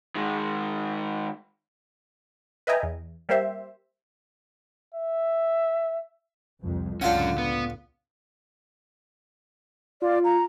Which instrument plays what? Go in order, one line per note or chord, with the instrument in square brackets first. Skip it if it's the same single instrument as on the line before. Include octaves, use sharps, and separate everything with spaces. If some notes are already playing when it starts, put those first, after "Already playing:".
[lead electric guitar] D#3 G#3
[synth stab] B4 D#5 E5 G5 G#5 A#5
E2
G3 A#3 G4 C5 E5
[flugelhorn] E5
[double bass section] C2 F2
[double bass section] C#2 A2 D3 [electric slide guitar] F#3 C#4 [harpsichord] D4 F4 F#5
[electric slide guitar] B3
[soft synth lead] F4 [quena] D5
[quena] A#5